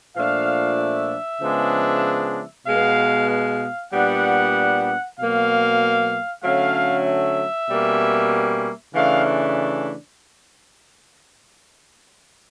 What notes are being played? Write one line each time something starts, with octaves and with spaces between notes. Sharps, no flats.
A#2 F3 A3 D4 F5
E5
C#3 F3 G#3 B3 D4
B2 G#3 B3 F5
F5
A#2 G3 B3 D4 F#5
B2 F#3 A#3 F5
D3 F#3 A3 C#4 F5
E5
B2 G3 A#3 C#4
C#3 E3 A3 D4 F5